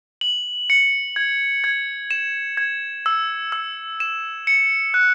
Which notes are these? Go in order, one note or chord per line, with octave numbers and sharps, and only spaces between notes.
F#7
C#7
G#6
G#6
E7
G#6
E6
E6
E7
C#7
F#6